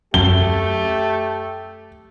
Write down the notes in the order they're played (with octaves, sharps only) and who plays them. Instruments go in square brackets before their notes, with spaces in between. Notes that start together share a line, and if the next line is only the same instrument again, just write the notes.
[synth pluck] F#2 [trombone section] A3 G4 [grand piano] G7